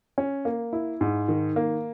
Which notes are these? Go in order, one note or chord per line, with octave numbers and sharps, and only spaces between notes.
C#4
A#3
E4
G#2
D#3
A#3